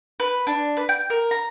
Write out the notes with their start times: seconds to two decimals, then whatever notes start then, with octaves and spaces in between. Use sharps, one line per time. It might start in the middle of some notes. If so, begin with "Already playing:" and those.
0.20 B4
0.47 D4
0.77 B4
0.89 G5
1.10 A#4
1.31 A#5